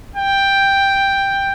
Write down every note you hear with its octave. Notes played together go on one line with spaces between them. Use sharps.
G5